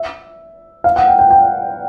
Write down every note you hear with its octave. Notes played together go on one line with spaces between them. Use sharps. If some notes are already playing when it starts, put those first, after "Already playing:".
Already playing: E5
F5
F#5
G5
G5
G5